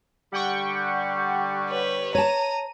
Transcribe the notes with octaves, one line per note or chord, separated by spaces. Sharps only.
D3 G3 F#5 G5 C#6
B4 C#5
C#5 A5 A#5 D#7